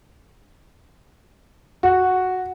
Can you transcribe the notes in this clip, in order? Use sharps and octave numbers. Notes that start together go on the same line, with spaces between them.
F#4